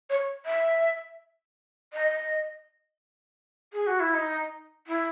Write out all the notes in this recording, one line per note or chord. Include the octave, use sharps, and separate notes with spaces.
C#5
E5
D#5
G#4
F#4
E4
D#4
E4